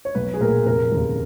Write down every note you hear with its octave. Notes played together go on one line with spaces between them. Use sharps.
C#5
B1 B4
G#4
A#2 A#4
F1 A#4
D#2 C#3